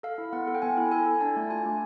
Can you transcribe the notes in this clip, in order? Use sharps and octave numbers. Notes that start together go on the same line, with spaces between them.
A4 F5
E4
B3 F#5
A4
G5
B3 G#5
E4
A4 G#5
A4
D4 A5
A3
F4 G#5
A3